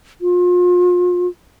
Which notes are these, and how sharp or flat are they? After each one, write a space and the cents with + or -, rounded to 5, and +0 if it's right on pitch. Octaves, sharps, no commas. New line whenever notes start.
F4 +35